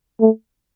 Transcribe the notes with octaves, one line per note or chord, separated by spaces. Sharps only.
A3